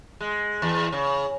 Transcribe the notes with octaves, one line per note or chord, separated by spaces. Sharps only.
G#3
E2
C#3